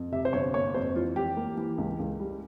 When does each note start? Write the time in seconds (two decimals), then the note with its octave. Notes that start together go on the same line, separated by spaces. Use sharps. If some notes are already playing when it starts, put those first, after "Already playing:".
Already playing: F2
0.12 C3 E5
0.25 C5
0.33 G1 C#5
0.54 A#3 C#5
0.75 F2 C5
0.96 E3 F4
1.16 E3 G4
1.37 A#3
1.57 E3
1.78 C#2
1.99 C#2
2.20 G3